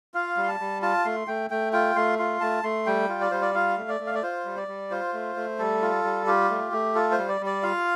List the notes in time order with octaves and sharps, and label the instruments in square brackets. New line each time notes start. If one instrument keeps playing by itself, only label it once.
[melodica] F4 F5
G3
C6
A5
G3
F4 A5
A3 C6
A3 G5
A3 G5
F4 G5
A3 C6
F4 C6
A3 A5
A3 C6
G3 G5
F4
D5
G3 C5
D5
F4 F5
A3
D5
A3
F5
D5
F4 C5
G3
D5
G3
F4 C5
A3
A3
G3 A4
F4
G3
F4 G4
A3
A3
F4 A4
C5
G3
D5
G3
D5
F4 F5